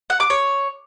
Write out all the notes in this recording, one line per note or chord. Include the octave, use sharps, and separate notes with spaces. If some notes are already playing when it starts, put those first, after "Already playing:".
F#5
D6
C#5